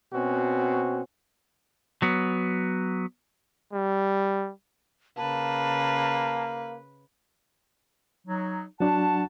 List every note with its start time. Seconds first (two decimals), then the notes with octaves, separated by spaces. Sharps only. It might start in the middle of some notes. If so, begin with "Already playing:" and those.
0.14 B2 C4 C#4 F#4
2.02 F#3 B3
3.73 G3
5.17 C#3 A#3 B4 A5
8.27 F#3 D#4
8.80 F#3 D4 F#4 F#5 A5